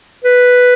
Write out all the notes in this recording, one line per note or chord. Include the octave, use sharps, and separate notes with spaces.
B4